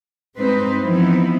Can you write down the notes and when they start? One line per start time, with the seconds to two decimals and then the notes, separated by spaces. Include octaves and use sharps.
0.38 G2 G#3 C4 D#4 B4 C5
0.83 E3 F3 B3 C4 D#4 E4